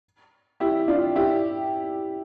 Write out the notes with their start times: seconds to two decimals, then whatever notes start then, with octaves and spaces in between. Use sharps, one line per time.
0.60 E4 G4
0.88 D4 F4
1.16 E4 G4